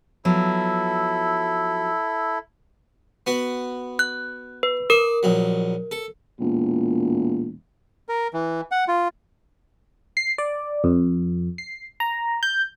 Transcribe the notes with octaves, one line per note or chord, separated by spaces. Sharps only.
F3 F#3 B3 E4 A4
B3 F#4
F#6
B4
A#4 D5
A#1 F#3
A4
E1 A#2
A#4
E3
F#5
F4
C7
D5
F2
C7
A#5
G6